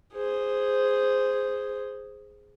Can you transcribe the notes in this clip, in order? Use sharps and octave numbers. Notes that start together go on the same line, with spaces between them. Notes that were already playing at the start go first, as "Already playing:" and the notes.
G#4 C5